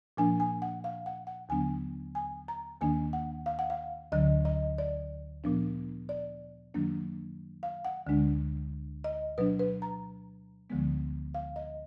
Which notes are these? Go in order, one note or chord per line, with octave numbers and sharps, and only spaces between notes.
A#2 F3 A#3 D4 G#5
G#5
F#5
F5
F#5
F#5
D#2 D3 F#3 B3 D4 G#5
G#5
A#5
D#2 D#3 A#3 D4 G#5
F#5
F5
F#5
F5
D2 D3 F#3 D#5
D#5
D5
A#2 F3 B3 D4
D5
F#2 D#3 F#3 A#3 D4
F5
F#5
D2 D3 G#3 D4
D#5
B2 F#3 D4 B4
B4
A#5
D2 D3 F3 G#3 B3
F5
D#5